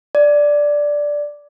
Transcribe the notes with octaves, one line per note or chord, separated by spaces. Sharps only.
D5